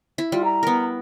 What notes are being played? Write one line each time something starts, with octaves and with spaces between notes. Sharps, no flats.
E4
G3 F4
A#5
B3 A#4